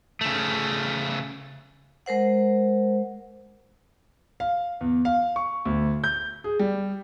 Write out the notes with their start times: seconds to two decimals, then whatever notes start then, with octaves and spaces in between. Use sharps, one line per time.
0.21 C#3 A3
2.06 G#3 A#4 C5 F#5
4.40 F5
4.81 E2
5.05 F5
5.36 C#6
5.65 D2
6.04 G6
6.44 G#4
6.59 G3